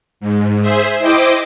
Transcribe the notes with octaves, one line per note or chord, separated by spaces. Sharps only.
G#2
G#4 C5 E5
E4 C5 D#5 G5 D6